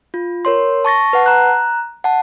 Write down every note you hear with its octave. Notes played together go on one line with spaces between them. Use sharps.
F4
A#4 C#5 C6
A5 C#6 A6 A#6
B4 F#5 A5
A#5 F#6
F#5 A5